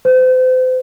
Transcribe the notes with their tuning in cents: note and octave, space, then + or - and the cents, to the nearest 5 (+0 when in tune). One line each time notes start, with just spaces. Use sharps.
C5 -40